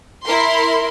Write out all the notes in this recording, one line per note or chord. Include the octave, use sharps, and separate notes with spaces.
E4 A#4 C6